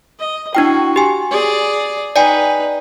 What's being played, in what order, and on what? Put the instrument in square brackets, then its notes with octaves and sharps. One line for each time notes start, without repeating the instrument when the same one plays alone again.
[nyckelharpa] D#5
[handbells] D4 E4 G5 [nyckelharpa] F#4
[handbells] G4 G#5
[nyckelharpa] G#4 D5
[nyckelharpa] D#4 B4 [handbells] D5 G5 G#5